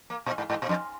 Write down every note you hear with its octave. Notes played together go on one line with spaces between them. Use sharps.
A#3
A#2
G#2
G#2
A#2
F2